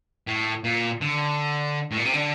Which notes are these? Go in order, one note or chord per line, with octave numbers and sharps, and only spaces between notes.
A2
A#2
D3
A2
A#2
C3
D3